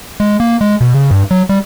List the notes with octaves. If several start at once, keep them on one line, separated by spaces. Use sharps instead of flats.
G#3
A#3
G#3
B2
C#3
G2
F#3
G3